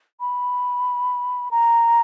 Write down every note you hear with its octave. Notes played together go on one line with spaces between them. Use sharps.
B5
A#5